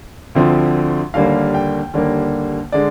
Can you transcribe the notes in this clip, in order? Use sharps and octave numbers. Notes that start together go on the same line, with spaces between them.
D2 D3 F3 C4
D#2 D3 G3 A#3 F5
G5
D#2 D3 G3 A#3
D3 G#3 D5